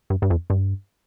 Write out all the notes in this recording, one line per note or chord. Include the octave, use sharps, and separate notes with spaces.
G2
G2
F2
G2